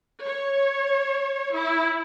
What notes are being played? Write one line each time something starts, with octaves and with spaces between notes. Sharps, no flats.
C#5
E4